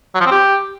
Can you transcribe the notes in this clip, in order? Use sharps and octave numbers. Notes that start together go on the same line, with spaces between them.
F#3
F3
C4
G4